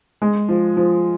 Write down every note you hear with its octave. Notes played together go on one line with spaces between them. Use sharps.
G#3
F3
F3